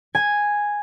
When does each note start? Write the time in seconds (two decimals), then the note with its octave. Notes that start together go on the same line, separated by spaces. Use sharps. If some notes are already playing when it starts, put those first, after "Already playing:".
0.15 G#5